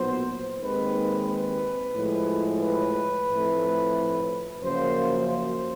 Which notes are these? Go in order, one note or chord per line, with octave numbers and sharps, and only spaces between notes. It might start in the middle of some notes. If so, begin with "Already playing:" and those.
Already playing: B1 A#2 F#3 B3 C5
D#2 D#3 G#3 C4 B4
B4
A2 F3 G#3
B4
A2 F3 A3 C4
F#2 C#3 F3 A#3 C5
C5